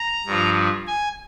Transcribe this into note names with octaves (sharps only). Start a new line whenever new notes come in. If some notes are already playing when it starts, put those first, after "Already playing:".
Already playing: A#5
G2 F3
G#5